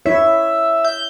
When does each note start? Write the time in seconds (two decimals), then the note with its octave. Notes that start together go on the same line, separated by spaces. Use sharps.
0.06 E4 C#5 E5
0.85 G6